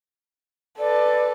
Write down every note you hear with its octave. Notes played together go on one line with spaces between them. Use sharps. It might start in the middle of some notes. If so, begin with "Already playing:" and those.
A4 B4 D5